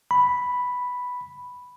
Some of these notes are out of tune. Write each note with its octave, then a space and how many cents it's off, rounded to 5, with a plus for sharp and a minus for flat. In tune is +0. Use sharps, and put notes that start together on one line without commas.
B5 +0